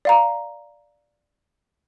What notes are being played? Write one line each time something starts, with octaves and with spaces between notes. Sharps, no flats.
D5 F5 A#5